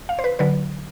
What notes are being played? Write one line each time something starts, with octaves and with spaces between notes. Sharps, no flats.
F5
C5
B4
D3 F#3 B4